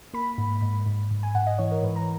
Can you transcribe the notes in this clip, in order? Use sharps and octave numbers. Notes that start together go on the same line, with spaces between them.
A#3 B5
G#2
G#2
G#2
G#2
G#5
G#2 F#5
D#5
E3 C#5
A#4
G#2 B4
A#5